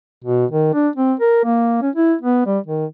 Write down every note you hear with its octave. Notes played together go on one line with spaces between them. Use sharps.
B2
D#3
D4
C4
A#4
A#3
C#4
E4
B3
G3
D#3